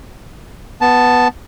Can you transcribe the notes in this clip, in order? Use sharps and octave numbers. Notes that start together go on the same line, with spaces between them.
B3 A5